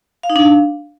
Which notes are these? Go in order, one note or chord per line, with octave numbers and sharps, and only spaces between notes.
F5
D#4
D4
F5